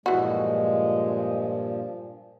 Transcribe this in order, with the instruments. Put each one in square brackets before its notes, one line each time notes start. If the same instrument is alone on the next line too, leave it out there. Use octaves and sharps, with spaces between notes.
[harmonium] G2 A#2 F3 [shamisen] E3 F#4 [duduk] G#3